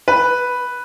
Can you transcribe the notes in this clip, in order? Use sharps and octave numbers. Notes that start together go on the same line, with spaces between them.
B4